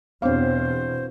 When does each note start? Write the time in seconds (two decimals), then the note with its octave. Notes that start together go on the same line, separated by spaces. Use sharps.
0.22 E2 B2 B3 C4 D4 C5 C#5 F5